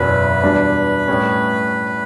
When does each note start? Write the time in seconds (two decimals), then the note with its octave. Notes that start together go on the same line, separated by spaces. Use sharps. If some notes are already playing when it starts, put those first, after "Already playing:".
Already playing: F#1 E2 B2 F#3 B4
0.43 E2 B2 G3 D4
1.08 A2 G3 C#4